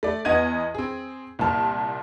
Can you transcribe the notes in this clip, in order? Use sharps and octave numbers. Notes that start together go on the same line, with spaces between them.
A3 D5
E2 B3 D#5 G#6 D#7
C4 G#4
C2 A#2 A5 F6